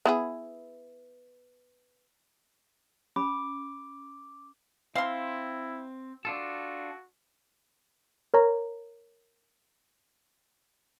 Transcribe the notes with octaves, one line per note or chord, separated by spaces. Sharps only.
B3 E4 G#4
C#4 B5 D6
C4 E4 F5 C6
D4 F4 F#4 A4
A#4 C#5 A#5